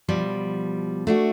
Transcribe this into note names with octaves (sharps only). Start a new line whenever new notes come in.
B2 F3 G3
A3 D4 F#4